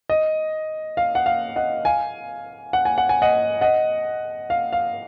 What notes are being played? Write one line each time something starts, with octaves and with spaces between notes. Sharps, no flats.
D#5
F5
F#5
F5
D#5 F#5
F5 G#5
F#5
G#5
F#5
G#5
D#5 F#5
D#5 F#5
F5
F5